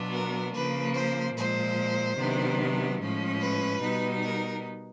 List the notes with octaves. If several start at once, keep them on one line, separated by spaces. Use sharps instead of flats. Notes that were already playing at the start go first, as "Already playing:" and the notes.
Already playing: B2 F#3 B3 D4 F4
A#4
C#3 F3 A#3 B4
C5
A#2 F3 G#3 C5
C3 D#3 F#3 B3 D4
A2 F3 G#3 C#4
B4
B2 G3 B3 D#4
A#4